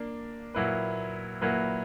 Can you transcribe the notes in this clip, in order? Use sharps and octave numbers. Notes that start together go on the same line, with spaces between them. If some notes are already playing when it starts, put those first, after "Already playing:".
Already playing: A#3 D4
A#2 F#3 A#3 E4 B4
A#2 F#3 A#3 E4 B4